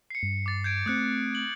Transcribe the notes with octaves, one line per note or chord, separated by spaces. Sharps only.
C7 C#7
G2
D6 A6
G6 G#6 D7
A3 C4 D#6 F#6 C#7
F#7